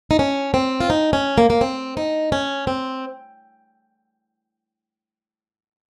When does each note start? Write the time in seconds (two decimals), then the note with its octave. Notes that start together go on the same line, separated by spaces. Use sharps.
0.11 D#4
0.19 C#4
0.54 C4
0.81 F4
0.90 D#4
1.13 C#4
1.38 A#3
1.50 A#3
1.61 C4
1.97 D#4
2.32 C#4
2.67 C4